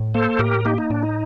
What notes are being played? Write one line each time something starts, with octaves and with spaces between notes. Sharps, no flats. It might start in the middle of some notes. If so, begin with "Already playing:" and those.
Already playing: A2
A#3 A4 C5
A2 G4 A#4
A#3 D#4 G4
D#4
A2 D4
D#4